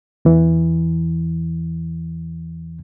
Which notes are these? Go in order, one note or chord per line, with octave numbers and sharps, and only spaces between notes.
E2 E3